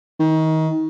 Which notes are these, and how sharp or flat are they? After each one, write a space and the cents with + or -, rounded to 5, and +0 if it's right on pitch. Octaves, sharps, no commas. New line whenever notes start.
D#3 +30